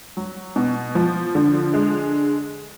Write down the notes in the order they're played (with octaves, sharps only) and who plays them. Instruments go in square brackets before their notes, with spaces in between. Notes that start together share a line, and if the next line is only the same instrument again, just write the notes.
[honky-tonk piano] F#3
B2
F3
D3
G#3